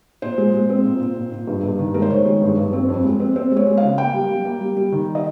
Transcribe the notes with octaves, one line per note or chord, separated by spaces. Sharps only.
A#2 C5
G#3
G#3
C4
A#2
A#2
A#2
A#2
G2
G2
D#3
G#3 A#4
C5
D#3 C#5
G#3
G2
G2
C4
F2
G#3
C4
C4 C5
G#3
C#5
G#3
F5
C#3
A#3 G5
G3
G3
A#3
G3
G3
D#3
D#5